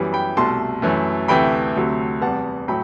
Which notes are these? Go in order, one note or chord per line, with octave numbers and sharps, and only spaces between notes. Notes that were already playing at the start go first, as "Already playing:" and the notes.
Already playing: F#2 E3 G3 B3
G5 B5
C2 B2 A3 A5 C6
F#2 E3 A3
D2 C3 E3 A3 G5 B5
D2 C3 F#3 A3
E2 C3 G3 B3 F#5 A5
A2 F#3 A3 G5 B5